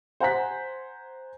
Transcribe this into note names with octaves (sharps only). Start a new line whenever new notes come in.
C5 F#5 G#5 A#5 F#6 B6